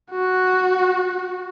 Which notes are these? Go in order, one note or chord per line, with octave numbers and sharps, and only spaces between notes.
F#4